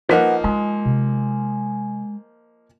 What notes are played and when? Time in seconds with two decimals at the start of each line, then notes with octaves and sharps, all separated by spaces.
0.09 F3 A#3 D#4 B4 D#5 F#5
0.44 G#3 F4
0.85 C3